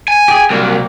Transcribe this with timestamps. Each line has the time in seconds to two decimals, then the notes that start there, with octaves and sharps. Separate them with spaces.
0.08 G#5
0.28 G4 G#4
0.50 C2 F#3 G3 A#3